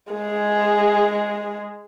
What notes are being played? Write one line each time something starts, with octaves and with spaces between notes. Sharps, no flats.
G#3 G#4